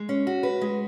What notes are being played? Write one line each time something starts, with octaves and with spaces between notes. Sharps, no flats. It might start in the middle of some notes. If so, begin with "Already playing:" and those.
Already playing: G#3
C#4
F#4
B4
G#3